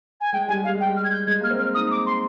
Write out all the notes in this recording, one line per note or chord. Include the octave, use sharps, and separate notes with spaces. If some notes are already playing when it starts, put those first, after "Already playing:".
G#5
G#3 G5
G3 G#5
G3 F5
G#3
G5
G3
F6
G#6
G6
G#3 G#6
A#3 F6
C4
F6
D#4 D#6
D6
C6